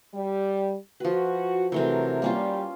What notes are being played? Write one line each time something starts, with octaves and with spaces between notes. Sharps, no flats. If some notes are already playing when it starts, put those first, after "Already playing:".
G3
F3 F#4 B4
C3 E3 F#3 A3 A#4
G3 A#3 C#4 F4